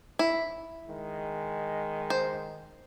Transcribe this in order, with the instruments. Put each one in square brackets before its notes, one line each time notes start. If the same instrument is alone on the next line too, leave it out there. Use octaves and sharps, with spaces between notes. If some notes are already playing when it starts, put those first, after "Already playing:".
[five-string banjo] E4
[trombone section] D#3 G#3
[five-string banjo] C5